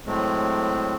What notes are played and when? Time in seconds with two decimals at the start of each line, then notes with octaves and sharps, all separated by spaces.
0.07 A2 F#3 G#3 A3 C4